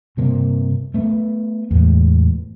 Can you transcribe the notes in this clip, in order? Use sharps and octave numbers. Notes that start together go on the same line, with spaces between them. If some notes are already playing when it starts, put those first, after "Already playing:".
G2 C3 A#3
A3 B3
E2 A2 G#3